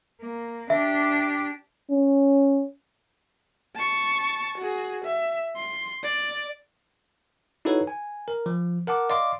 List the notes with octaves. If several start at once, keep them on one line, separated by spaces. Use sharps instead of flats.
A#3
D4 G4 E5
C#4
A5 C#6
F#4 G#4
E5
C6
D5
D#4 E4 F#4 A4 B4 C#5
G#5
A#4
F3
A#4 F#5 A5 D6
D5 D#5 F5 C6 D6